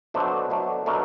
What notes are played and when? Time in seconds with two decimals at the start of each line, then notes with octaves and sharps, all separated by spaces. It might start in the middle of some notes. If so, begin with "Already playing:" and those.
0.14 B2 F#3 A3 D4 C5
0.50 B2 F#3 A3 D4
0.86 B2 F#3 A3 D4 A#4